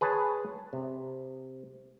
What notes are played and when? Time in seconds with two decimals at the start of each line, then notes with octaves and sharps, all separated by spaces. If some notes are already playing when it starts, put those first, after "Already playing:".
0.01 G#4 B4 C#5 A5
0.73 C3